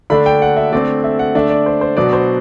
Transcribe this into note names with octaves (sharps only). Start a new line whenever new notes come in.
D3 A3 D4 B5
G5
F#5
E5
D3 A3 C4 D5
E5
F#5
D3 A3 D4 E5
D5
C5
C5
B2 F#3 B3 D4 D5
C5